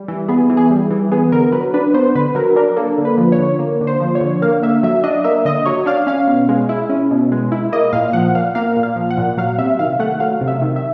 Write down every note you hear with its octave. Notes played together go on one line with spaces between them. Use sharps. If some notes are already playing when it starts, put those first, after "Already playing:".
Already playing: G3
E3
B3 G#4
E3
G#4
G3
E3
B3 G#4
D3 A#4
F#3 B4
D4 B4
B3 C5
D3 B4
F#3 A#4
D4 A#4
A#3 A4
D3
B4
F3
C#5
D3
A#3
D3
C5
F3
C#5
D3
A#3 F5
D3 E5
F#3 E5
D4 D#5
A#3 E5
D3 D#5
F#3 C#5
D4 F5
C#4 F5
B2
G#3
E4
C#4
B2
G#3
E4
A#3 D#5
A#2 F5
F3 F#5
A#2 F5
A#3 F5
A#2
F5
F3
F#5
A#2
F#3 F5
C3 E5
D#3 F5
A3 F#5
F#3 F5
C3
E5
D#3
E5